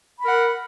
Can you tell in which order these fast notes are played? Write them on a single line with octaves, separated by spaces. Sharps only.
B5 A#4 F#5